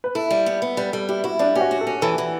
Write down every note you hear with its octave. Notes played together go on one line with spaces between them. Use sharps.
B4
E4 A4
G3
B3
B3
G3 B4
G3 A4
E4 G4
E4 F#4
G3 D4
C#4 G4
F#4
F#4
A4
C#4
E3 A4
E3